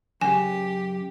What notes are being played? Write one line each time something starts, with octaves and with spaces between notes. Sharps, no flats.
F#2 C#3 G4 G#5